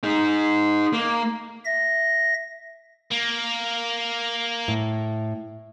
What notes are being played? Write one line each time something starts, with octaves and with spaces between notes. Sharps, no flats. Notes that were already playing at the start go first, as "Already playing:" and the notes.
D#4 G#4
A#3
E5 A#6
A#3
A2